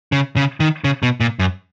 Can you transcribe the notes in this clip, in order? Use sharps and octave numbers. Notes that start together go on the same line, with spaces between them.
C#3
C#3
D#3
C#3
B2
A#2
F#2